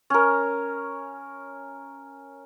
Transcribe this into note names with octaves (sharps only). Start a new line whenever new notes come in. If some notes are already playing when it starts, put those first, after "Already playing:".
C#4 A#4